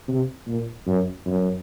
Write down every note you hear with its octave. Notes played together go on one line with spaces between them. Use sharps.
C3
A#2
F#2
F#2